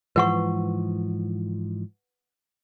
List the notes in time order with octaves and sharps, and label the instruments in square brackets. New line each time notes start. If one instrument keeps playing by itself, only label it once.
[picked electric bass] G#2 E3 F3 [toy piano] B4 F#5 C#6